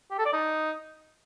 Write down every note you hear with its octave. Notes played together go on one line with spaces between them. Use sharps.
G4
A4
D5
D#4